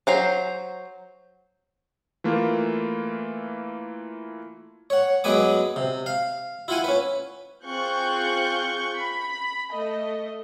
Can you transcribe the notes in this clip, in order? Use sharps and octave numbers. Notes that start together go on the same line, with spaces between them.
F#3 C5 A#5
E3 A3 A#3 F4
C#5 F#5
F#2 G#3 B3 B4 G#5 D6
C3
F5
E4 F4 F#5 G#5
C#4 B4
C4 F4 G#4 C#6 F#6 G6
B5
A3 D#5